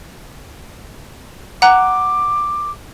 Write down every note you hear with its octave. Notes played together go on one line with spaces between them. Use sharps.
F#5 A#5 D6 F#6